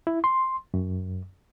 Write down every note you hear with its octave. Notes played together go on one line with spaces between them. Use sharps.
E4
C6
F#2